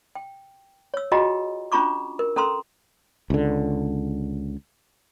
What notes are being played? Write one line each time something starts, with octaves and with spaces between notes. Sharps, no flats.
G5
C#5 E6
F4 F#4 G#4 D#5 G5 A#5
C#4 D4 F4 A#5 C#6 D6
A#4
C#4 A4 A#5 C6 E6
C#2 D3